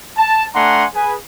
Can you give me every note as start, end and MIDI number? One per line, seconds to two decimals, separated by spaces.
0.18 0.47 81
0.55 0.85 57
0.55 0.85 62
0.55 0.85 78
0.55 0.85 80
0.55 0.85 82
0.55 0.85 84
0.95 1.16 68
0.95 1.16 71
0.95 1.16 80